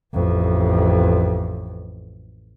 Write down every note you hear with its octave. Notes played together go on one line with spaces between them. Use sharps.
A1 F2